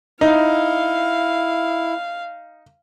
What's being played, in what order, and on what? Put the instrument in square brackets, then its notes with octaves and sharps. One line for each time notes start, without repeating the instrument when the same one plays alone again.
[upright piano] D#4 [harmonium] E4 [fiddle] F5